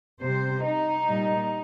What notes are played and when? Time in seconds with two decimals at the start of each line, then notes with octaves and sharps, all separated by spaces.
0.20 C3 G3 C5
0.64 D#4
1.07 A#2 G3